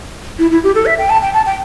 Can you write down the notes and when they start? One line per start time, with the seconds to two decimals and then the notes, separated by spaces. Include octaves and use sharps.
0.39 E4
0.51 E4
0.63 G4
0.75 A4
0.86 E5
0.99 G5
1.10 A5
1.22 G5
1.34 A5
1.46 G5